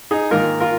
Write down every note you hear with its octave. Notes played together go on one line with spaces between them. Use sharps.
D#4 G#4
G#2 D#3 A#3 F4 A#4
F4 A#4